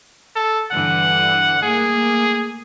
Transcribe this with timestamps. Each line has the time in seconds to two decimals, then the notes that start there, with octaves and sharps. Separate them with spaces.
0.36 A4
0.72 G2 D3 E3 F#5
1.63 A3 A#3 G#4